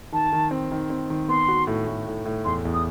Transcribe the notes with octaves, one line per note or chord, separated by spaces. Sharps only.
D#3 A5
D#3
C4
D#3
C4
D#3
B3 C6
F#4
A2
A2
A2
A2
E2 C6
E2
D#6